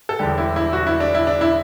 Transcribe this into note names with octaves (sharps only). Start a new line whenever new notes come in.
A4
E1 E2 D3 G3 G4
E4
E4
F#4
E4
D4
E4
D4
E4